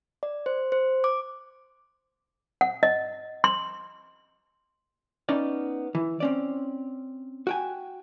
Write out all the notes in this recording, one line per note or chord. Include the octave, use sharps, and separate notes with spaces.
D5
C5
C5
D6
F#5
D#5
C6
B3 C#4 D#4 D5
E3
C4 C#4 D5
F#4 G5 G#5